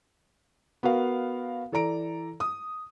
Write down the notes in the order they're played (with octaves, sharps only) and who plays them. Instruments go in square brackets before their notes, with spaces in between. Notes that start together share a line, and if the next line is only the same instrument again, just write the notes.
[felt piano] B3 F#4 A#4 F5
E3 A4 D5 A#5 D7
D#6